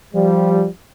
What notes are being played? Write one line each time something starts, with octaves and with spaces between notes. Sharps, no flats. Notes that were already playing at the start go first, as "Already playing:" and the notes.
F3 G3